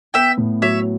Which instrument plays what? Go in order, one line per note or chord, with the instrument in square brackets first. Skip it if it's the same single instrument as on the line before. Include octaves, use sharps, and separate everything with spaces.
[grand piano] B3 [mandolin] E5 G5
[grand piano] A2
[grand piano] F#3 [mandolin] C#5 E5